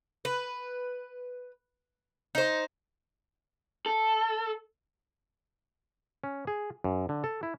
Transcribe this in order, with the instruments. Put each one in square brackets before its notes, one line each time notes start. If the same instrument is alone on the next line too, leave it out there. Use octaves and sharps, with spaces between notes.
[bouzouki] B4
D#4 C5
[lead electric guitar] A4
[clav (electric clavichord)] C#4
G#4
F#2
D3
A4
E4